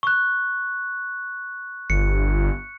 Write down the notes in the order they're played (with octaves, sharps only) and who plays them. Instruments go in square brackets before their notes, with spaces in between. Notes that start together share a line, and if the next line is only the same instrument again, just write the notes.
[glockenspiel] C#6 F#6
[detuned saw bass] G1 [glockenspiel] C#7